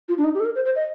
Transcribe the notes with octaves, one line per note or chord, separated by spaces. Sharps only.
F4
D4
D#4
G4
A4
A#4
C5
C5
D#5